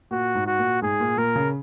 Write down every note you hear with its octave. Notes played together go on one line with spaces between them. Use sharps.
A#2 F#4
G#2
F#4
A#2
G#2 G#4
A#2
A#2 A#4
C#3